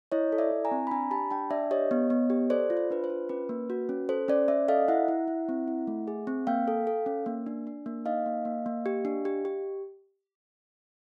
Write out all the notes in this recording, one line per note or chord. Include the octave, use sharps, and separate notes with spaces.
E4 C#5 D#5
A4
D5 E5
E4
G#5 A#5
C4
B5
D4 G#5 A#5
G4 A5 B5
D4 G5 A5
D4 D5 E5
G4 C#5 D#5
B3
B3
G4
A4 C5 D5
F4
C5
D4 B4
C5
F4
C#4 B4
A#3
F#4
C#4
A4 C5
C#4 C5 D5
C#4 D5 E5
A4 D#5 F5
E4 E5 F#5
E4
E4
C4
E4
A3
G#4
C4
A#3 F5 G5
A4
A4
C#4
A#3
D4
D4
A#3
D#4 D#5 F5
A#3
A#3
A#3
G4
D4
G4
G4